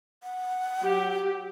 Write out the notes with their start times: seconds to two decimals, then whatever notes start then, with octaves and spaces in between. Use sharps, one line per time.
0.23 F#5
0.79 F#3 G4